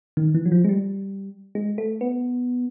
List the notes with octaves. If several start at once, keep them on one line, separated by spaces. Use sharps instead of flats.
D#3
E3
F#3
F3
G#3
G3
G#3
A3
B3